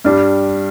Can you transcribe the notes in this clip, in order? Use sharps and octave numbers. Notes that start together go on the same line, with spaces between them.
G2 G3 D4